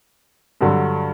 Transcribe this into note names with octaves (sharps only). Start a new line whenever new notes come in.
G2 D3 F#3